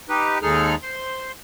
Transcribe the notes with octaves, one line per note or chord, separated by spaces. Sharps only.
D#4 G4 B4
D#2 G#3 D#4 G#4 A4 F6
C5 C6